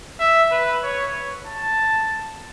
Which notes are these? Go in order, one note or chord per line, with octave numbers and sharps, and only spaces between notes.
E5
B4
C#5
A5